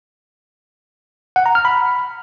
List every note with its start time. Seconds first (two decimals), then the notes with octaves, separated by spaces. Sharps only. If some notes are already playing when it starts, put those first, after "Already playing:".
1.36 F#5
1.46 A#5
1.55 F6
1.65 B5